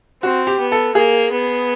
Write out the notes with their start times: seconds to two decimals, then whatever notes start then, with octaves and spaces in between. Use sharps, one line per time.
0.23 C4 F#4
0.47 G4
0.59 B3
0.72 A4
0.95 A#3 G#4
1.32 B3